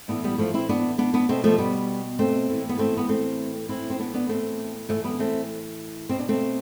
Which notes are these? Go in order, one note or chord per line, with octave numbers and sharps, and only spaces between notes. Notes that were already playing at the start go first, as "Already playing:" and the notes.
A2 E3 B3 D4
G3 B3
F3 A3
C4 E4
B3 D4
B3 D4
B3 D4
B2 A3 C4
F3 A3
G3 B3
A3 C4
A2 E3
B3
A3 C4
B3
A3 C4
A2 E3 C4 E4
C4
B3 D4
B3 D4
A3 C4
A2 E3 F3 A3
G3 B3
D4
A3 C4
B2 C4
D4
A3 C4